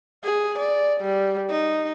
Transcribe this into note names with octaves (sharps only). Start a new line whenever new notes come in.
G#4
D5
G3
D#4